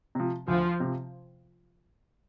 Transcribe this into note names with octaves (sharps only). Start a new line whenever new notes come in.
C3 F3
D2 F3 F4
C3 F3